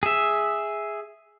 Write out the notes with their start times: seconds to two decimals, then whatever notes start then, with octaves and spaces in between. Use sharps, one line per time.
0.03 G#4 E5